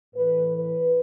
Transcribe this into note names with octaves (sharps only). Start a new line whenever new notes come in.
A2 E3 B4
B4